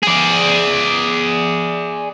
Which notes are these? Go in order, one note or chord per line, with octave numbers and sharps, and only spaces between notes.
G#4 D5